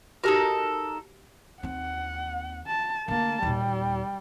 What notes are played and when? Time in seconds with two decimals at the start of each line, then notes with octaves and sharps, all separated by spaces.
0.24 D#4 F#4 G4 A4 A#4
1.63 D#2 C4 F#5
2.67 A5
3.08 D3 A3 A#3 A5
3.42 D#2 A#2 G3